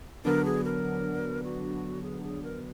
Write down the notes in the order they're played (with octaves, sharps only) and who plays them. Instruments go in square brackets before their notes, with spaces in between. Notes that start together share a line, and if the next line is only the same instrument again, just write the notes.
[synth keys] D3 F#3 B3 D4 [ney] A#4
[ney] G#4
A#4
F#4
G#4
G#4
A#4